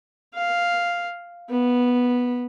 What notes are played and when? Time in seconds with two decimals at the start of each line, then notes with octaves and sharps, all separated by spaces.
0.35 F5
1.50 B3